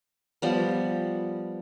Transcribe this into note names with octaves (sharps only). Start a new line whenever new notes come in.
F3 G3 B3